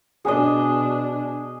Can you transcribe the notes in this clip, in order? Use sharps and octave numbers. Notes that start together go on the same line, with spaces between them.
B2 D4 G#4 D#5